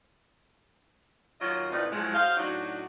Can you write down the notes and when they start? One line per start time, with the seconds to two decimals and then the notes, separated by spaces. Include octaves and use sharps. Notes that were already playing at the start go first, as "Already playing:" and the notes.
1.40 D#2 F#3 F4 D#5
1.71 A2 C3 D#4 F4 B4 D5
1.91 A2 F3 F#3 G#3
2.14 F#4 C5 D#5 F5
2.37 A2 F#3 D4 D#4 F#4